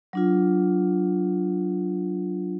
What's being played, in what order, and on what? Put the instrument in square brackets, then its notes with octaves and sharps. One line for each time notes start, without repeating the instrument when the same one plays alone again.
[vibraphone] F#3 D4 F4